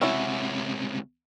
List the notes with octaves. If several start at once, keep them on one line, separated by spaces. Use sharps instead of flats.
C#2 C3 C#4 E4 F#4